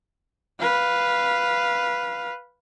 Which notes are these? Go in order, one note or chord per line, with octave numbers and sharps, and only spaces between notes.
B4 F5